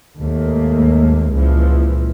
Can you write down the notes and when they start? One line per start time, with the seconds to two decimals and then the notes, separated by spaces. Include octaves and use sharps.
0.19 D#2 G#2 A3 A#3
1.32 C#2 A#2 E3 F3